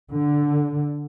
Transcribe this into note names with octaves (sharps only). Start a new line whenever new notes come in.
D3